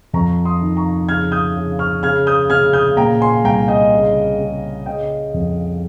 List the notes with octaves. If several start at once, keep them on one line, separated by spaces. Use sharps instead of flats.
F2 A#5 C#6
C6 D#6
D#3
A#5 C#6
C#3 F6 G#6
D#6 G6
C#3
C#6 F6
C#3 F6 G#6
D#6 G6
C#3 F6 G#6
D#6 G6
A#2 G5 A#5
G#5 C6
C2 G5 A#5
D#5 G5
C#3
C#3
C#3 D#5 G5
F2